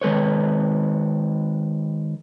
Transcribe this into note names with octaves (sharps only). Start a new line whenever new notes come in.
D#3 G#3 B4 C#5